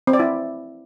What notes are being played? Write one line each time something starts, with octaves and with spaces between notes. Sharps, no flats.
C4
D5
E4